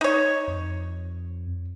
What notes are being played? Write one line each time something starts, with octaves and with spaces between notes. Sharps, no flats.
D#4 C#5
F2